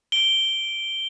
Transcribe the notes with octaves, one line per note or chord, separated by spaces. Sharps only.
D7 G7